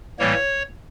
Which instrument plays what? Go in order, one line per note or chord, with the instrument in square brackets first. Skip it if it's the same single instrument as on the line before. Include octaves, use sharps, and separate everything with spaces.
[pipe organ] A2 E3 G3 A#3 C#5